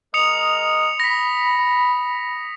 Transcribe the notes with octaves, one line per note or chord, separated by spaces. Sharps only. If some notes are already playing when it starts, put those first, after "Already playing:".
G#3 A#4 D#5 D#6 C#7 F7
B5 A#6 B6